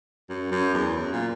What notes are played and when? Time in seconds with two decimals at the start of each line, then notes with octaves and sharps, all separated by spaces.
0.30 F#2
0.52 F#2
0.74 E2
0.96 F#2
1.12 A#2